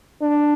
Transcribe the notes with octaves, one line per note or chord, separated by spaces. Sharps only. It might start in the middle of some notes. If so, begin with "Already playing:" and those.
D4